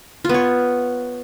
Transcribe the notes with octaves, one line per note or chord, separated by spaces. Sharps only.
B3 F4 C#5